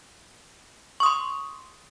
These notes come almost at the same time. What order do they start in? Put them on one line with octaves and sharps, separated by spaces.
C#6 D#6 C6